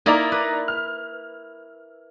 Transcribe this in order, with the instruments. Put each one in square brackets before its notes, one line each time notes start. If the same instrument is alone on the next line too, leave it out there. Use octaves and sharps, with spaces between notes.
[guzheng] A#3 E4 [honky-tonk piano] D#4 D5 A#5
[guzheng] B4
[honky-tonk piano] F6